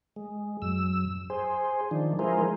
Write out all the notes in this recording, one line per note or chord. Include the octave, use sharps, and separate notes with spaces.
G#3
F#2 E6
G#4 C5
D#3 F3 D4
F3 G#3 E4 G#4 A#4 C5